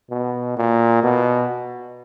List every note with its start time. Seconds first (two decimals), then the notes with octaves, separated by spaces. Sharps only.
0.10 B2
0.57 A#2
1.03 B2